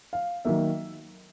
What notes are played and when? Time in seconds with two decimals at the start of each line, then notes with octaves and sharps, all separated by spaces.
0.13 F5
0.45 D#3 F#3 A#3 E5